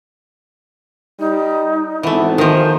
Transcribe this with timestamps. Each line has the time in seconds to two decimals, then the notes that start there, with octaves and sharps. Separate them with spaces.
1.19 G3 D#4
2.03 G#1 E3 A3 B3 E4
2.38 D#3 F3 A#3 C5